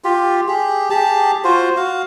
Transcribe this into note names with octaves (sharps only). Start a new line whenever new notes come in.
F4 G4
G4 G#4
G4 G#4 A5
F4 F#4 C5
F#4 F5